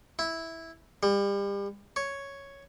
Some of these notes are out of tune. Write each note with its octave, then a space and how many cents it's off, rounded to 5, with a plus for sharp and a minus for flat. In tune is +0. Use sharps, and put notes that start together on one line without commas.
E4 -10
G3 +35
C#5 +0